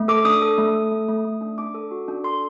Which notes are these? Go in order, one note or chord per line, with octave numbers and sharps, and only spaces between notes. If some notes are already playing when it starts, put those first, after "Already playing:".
Already playing: A3
A4 D6
D4 D#6
A4
A3
A4
A3
A3
A3
D4
D4 D6
A4
F#4
D4
A4 C6